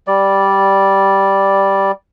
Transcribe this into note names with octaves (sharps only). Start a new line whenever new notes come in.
G3 D5